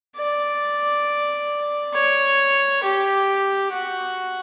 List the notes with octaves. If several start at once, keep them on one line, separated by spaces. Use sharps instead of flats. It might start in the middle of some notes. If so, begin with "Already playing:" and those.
D5
C#5
G4
F#4